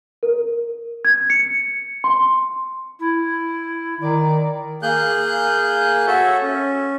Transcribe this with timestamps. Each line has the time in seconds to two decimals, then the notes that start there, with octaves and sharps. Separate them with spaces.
0.23 A#4
1.05 G#6
1.30 C#7
2.04 C6
2.99 E4
4.01 D#3 D5
4.82 A#3 G#4 F#6 G6
6.07 F#4 A4 C#5 E5
6.42 C#4